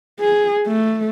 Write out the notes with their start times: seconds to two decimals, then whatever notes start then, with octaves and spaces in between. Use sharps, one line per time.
0.20 G#4
0.67 A3